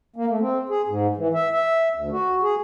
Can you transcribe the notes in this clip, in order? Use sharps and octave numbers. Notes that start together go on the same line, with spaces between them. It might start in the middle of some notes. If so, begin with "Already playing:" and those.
A#3
A3
C4
G#4
G#2
E3
E5
E5
D2
F#4
G#4